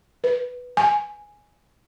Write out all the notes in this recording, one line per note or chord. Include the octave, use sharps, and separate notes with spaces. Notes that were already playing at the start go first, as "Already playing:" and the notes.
B4
G#5